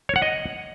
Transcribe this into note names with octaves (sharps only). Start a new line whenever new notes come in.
C#5
F#5
D#5